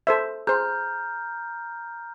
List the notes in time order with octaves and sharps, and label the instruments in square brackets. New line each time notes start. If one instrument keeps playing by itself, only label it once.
[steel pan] A4 C5 E5
[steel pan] G#4 C5 [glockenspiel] A#5 F6 G6